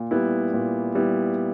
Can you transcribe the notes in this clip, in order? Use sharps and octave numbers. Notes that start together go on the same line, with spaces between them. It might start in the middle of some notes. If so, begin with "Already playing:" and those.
Already playing: A#2
G3 B3 E4
A#2
G3 B3 E4